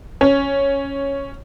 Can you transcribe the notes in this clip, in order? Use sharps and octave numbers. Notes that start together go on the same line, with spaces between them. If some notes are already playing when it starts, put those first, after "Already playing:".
C#4